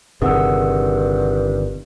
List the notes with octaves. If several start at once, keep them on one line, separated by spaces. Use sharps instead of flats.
G1 G2 C3 D#3 G#4 F#5 E6